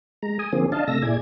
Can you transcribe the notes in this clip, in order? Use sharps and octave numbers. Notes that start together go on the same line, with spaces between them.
G#3 A#5
G#5 D#6
D3 F3 A#3 C4 G#4
D4 D#5 F5 A5
C3 A3 E6 A#6
A#2 E4 G#4 D5 G#6